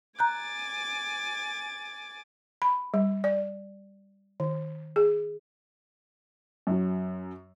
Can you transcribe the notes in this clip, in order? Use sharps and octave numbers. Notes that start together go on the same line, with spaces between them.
G#5 A#5 D6 F#6 G6 A6
B5
G3
D5
D#3
G#4
F#2 F#3